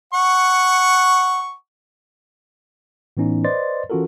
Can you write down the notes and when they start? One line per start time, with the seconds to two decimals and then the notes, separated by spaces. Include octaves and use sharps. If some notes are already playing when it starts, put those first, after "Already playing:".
0.13 F#5 C#6
3.17 A2 E3 B3 C#4 D#4
3.44 B4 C5 D5 D#5 C6 A6
3.90 E3 C#4 F4 F#4 A4 A#4